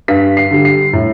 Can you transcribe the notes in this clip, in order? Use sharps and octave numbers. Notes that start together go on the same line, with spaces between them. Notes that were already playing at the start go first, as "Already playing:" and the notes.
G2 B6
C7
D3 G3
C7
A2